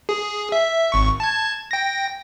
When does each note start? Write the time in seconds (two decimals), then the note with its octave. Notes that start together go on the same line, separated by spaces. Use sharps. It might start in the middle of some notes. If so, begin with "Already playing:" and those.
0.09 G#4
0.52 E5
0.92 G#1 C#6
1.20 A5 G#6
1.71 G5 A#6